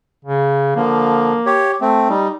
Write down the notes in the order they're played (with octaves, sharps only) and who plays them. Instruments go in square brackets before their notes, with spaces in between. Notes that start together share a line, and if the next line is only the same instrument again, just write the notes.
[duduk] C#3
[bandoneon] D3 F3 [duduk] A#3
[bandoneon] G4 C#5
A3 C4
[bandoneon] G3 [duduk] D#4